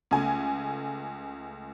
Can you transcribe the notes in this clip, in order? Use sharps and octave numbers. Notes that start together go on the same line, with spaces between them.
C#2 A3 G#5